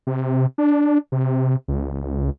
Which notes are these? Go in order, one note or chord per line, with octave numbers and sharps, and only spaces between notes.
C3
D4
C3
C#2